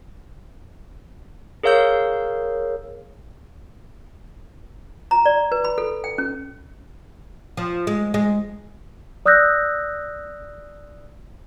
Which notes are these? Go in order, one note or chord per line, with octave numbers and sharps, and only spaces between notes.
G#4 A#4 C#5 F5 E6 G6
A#5
D5
B4
B5
A4
G5
C#4
F3
G#3
G#3
D5 D#6 E6 F#6 G6 A#6